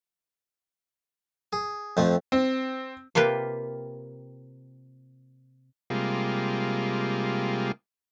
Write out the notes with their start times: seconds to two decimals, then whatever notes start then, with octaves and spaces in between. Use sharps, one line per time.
1.53 G#4
1.97 F2 A3 C4
2.32 C4
3.15 C3 A#3 F4 G4 B4
5.90 C3 G3 G#3 A#3 F4